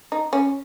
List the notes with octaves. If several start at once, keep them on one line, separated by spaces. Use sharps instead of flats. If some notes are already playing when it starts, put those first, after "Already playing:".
D#4
C#4